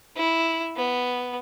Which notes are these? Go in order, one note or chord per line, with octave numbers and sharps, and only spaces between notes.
E4
B3